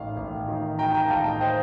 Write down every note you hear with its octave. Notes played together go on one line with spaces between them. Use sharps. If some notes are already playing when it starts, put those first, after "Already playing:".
Already playing: A1 D#3 F5
A1
D#3
D#3 G5 A#5
G5 A#5
A1 F5 A5
D#5 G5
C5 D#5